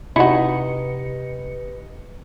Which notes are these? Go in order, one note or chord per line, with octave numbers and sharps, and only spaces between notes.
C3 D#4 E4 F#4 G4 B4 D#5 C#7